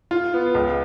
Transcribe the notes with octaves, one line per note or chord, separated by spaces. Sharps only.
F4
B3
C#2